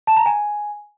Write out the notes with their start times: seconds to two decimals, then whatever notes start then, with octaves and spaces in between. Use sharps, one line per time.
0.07 A5
0.17 A#5
0.26 G#5